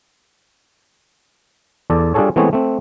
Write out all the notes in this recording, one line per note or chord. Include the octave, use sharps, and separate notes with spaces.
E2 A4 D5
G3 D4 F4 G#4 A4 C#5
E3 G#3 A3 B3 C4 C#5
A3 C4